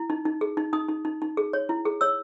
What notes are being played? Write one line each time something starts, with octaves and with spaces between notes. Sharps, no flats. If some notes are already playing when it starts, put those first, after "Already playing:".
Already playing: E4
D#4
D#4
G#4
D#4
D#4 D#6
D#4
D#4
D#4
G#4
C#5
E4
G#4
C#5 E6